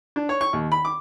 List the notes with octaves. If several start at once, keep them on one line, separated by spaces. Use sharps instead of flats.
D4
C#5
C#6
D#2
B5
D6